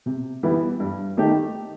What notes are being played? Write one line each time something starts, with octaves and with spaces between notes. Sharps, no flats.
C3
E3 G3 B3 E4
G2
D#3 A3 D#4 G4